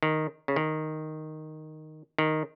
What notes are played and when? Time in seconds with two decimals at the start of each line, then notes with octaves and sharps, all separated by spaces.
0.03 D#3
0.48 C#3
0.56 D#3
2.18 D#3